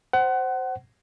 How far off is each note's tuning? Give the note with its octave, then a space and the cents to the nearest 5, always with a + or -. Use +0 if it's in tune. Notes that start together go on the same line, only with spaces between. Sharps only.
C5 +0 F#5 +25